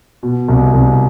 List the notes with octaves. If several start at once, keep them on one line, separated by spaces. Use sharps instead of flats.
B2
C2
C2